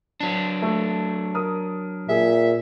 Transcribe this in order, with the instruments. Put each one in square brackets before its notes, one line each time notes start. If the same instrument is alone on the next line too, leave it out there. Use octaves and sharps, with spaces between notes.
[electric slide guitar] F#3 D4
[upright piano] A3
A#4 D#6
[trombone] A#2 [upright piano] G#4 [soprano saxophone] E5